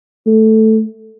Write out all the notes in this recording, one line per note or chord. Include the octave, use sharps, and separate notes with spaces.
A3